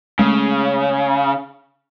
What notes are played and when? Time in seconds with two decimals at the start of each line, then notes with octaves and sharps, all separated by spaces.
0.19 C#3 G#3 A3